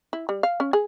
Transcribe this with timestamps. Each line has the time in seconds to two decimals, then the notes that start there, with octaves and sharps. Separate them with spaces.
0.13 E4
0.29 G3
0.43 F5
0.60 C#4
0.73 G#4